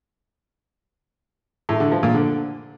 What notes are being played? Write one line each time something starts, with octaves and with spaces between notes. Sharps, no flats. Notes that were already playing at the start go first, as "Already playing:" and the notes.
A2
D3
F3
A#2
D3